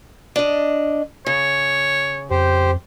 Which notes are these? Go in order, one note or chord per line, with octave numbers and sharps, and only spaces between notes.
D4 D#5
C#3 C#5
F2 G4 C5